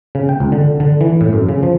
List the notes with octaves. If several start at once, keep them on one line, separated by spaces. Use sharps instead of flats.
C#3
G5
C#2
D3
D3
E3
A2
F#2
C#3
F3